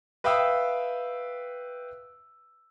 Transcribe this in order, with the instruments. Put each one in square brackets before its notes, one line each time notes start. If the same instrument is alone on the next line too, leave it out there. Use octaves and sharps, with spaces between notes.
[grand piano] B4 E5 F5 G5 D#6 E6